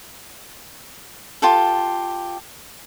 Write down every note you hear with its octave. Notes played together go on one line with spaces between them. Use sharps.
F4 G4 A4